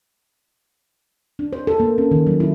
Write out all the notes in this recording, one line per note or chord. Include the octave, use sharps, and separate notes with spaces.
D4
C5
A4
A#3
C#4
D#3
F#3
E4